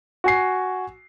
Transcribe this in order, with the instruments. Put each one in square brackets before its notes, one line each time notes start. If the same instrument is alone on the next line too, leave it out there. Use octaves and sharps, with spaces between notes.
[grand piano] F#4 G#5 C7